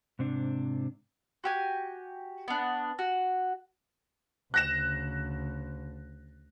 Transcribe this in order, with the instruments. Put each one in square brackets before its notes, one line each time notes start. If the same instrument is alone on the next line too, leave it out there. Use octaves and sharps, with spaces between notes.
[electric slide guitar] G#2 C3 D4
[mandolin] F#4 G4 G#5
B3 D4
F#4
[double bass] D2 C#3 [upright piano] F#6 A#6 E7